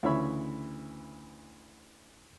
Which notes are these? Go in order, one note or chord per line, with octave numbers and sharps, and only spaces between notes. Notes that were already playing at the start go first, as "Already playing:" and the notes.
D2 C#3 E3 C#5 E5 B5